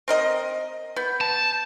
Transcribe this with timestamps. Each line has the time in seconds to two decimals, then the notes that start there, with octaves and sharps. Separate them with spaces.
0.08 C4 A#4 D#5
0.96 B3 G6
1.21 A5